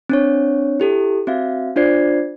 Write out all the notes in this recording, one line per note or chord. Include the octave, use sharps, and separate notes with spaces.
C4 D4 C#5
E4 G4 A4
C4 F#4 E5 F5
D4 F4 C5 D5 G#6 C7